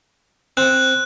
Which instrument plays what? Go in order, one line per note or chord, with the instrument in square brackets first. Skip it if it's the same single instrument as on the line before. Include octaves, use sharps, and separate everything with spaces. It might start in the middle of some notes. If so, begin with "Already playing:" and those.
[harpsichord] C4 [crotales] F#6